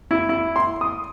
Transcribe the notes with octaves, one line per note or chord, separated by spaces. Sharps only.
E4
E4
C6
D#6